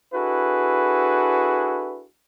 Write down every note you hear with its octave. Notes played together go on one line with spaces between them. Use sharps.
D4 E4 F#4 G#4 A4 B4